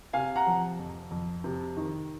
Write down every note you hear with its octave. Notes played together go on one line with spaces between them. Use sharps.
C3 F5 G#5
F#5 A#5
F3
F2
F2
C3
D#3